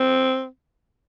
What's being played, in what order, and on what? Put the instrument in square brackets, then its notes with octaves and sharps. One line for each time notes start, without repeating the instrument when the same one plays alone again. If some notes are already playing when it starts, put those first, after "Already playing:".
Already playing: [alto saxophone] C4